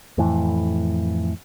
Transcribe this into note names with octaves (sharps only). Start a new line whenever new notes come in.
F2 A2 E3